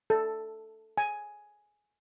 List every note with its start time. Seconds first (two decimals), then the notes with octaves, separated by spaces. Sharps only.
0.10 A4
0.97 G#5